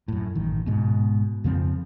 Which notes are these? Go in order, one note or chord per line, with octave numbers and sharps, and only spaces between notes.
F#2 A2
A1 D#3
G#2 B2
F2 C#3 F3 C4